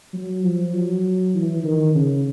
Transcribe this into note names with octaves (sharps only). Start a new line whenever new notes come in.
F#3
F3
F#3
E3
D#3
C#3